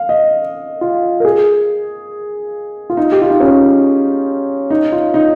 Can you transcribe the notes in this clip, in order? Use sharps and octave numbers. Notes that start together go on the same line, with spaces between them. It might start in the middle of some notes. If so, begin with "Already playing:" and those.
Already playing: F5
D#5
F4
A#4
G#4
F4
D#4
G4
F4
D#4
C#4
D#4
F4
D#4